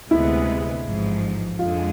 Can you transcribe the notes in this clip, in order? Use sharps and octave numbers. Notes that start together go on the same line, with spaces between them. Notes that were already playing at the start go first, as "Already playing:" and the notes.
D2 C3 G#3 B3 E4
A1 G#2 F3
F2 D3 G#3 F4